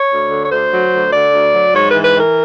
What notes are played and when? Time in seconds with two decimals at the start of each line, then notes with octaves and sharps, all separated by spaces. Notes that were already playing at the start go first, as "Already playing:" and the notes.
Already playing: C#5
0.11 D2
0.31 D3
0.45 C#5
0.51 D2 C5
0.72 F#3
0.92 D2
1.13 D3 D5
1.33 D2
1.53 F#3
1.73 G#2 C#5
1.89 E3 B4
2.04 B4
2.14 E3
2.19 A#4